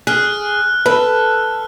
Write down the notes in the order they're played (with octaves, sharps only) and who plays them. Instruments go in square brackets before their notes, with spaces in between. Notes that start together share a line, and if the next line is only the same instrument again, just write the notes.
[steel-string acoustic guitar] G#4 [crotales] F6 F#6
[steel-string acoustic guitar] A4 [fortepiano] B4